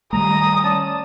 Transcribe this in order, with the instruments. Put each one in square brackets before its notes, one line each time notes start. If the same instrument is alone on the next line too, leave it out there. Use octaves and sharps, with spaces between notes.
[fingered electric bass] D#3 G3 A3 [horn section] A#5 [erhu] D#6
[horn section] C#4 D5 A5